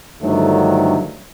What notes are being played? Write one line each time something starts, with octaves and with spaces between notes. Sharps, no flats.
G2 D3 D#3 F3 F#3 A3